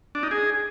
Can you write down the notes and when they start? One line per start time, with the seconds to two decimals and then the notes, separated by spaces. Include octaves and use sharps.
0.15 D4
0.23 D#4
0.31 G#4